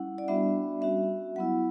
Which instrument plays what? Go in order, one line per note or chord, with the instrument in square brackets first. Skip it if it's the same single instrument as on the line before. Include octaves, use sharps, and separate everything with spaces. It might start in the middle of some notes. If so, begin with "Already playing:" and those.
Already playing: [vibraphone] G3 C#4 E4 F#5
D5
G3 B3 D4 F#4 E5
G3 C#4 F#4 E5
F#3 B3 E4 F#5